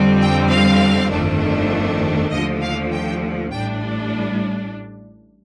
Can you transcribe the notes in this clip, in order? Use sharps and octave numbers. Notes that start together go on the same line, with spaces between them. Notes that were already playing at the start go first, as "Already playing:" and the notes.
Already playing: F2 D3 G3 C4
G5
F5
G1 F2 D#3 A3 D4
D#2 D3 F3 A3 D#5
F5
G5
A1 A2 G3 D4 G5